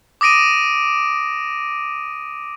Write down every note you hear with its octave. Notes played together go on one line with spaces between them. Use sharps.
D6 D#6 A#6 D7 D#7